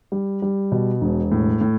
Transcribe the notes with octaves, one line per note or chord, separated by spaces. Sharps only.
G3
G3
B2
E1
A2
A2